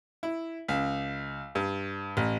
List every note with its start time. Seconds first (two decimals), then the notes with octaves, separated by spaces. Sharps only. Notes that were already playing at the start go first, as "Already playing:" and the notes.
0.23 E4
0.69 C#2
1.55 G2
2.17 A1